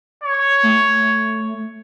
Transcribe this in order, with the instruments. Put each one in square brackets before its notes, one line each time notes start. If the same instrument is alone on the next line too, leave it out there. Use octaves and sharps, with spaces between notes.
[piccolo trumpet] C#5
[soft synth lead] A3